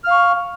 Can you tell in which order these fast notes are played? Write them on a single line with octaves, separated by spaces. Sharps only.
F6 F5 C#6